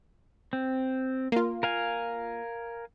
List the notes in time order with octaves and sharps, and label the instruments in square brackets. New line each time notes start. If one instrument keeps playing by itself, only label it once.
[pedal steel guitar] C4
[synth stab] A#3 F4
[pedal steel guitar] A#4 F5 G#5